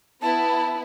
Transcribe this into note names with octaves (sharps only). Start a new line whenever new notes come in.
B3 E4 A5